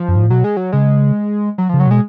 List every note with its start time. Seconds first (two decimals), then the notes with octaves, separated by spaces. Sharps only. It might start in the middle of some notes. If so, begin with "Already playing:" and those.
Already playing: F3
0.08 F#2
0.16 G#2
0.22 A2
0.30 B2 F#3
0.44 G#3
0.57 F#3
0.72 C#3 G#3
1.58 F#3
1.69 C#3 F3
1.80 F#3
1.87 B2 G#3